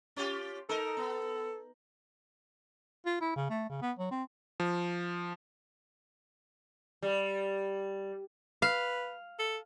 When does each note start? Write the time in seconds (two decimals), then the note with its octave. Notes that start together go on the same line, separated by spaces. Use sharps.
0.16 C#4 F4 G4
0.69 D#4 A4 A#4
0.97 B3
3.06 F4
3.21 E4
3.36 C#3
3.50 A3
3.69 C#3
3.82 B3
3.99 F#3
4.11 C4
4.60 F3
7.02 G3
8.62 B4 F5
9.39 A4